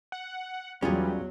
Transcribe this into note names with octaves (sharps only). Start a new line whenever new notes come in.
F#5
E2 F#3 G3 C#4 F4 G#4